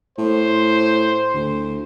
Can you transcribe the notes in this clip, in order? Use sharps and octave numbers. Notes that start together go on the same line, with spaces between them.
A2 C5
D2